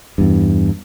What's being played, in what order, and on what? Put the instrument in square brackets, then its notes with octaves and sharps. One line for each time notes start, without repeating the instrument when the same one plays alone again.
[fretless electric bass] E2 G2